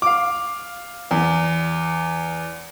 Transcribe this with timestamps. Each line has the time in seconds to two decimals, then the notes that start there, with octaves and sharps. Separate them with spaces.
0.02 F5 D6
1.11 E2